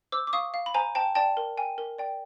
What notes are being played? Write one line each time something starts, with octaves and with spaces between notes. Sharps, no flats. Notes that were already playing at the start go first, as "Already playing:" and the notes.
C5 D6 E6
D6
F5 C#6 D#6
F5
B5
C5 G#5 A#5
C5 G5 A5
D5 G5 A5
A#4
G5 G#5
A#4
D5 G5